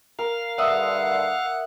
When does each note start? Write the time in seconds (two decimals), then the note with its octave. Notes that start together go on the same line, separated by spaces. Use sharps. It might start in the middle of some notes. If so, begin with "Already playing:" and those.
0.19 A#4 F5
0.58 G2 D3 E5 F#5 D#6